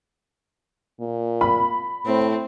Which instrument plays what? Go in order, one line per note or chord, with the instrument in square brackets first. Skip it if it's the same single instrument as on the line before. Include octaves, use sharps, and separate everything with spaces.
[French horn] A#2
[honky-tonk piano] B5
[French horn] A2 [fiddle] C4